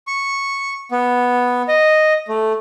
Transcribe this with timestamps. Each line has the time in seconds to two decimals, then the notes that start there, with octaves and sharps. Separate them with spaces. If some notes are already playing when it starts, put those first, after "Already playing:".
0.07 C#6
0.91 B3
1.68 D#5
2.28 A3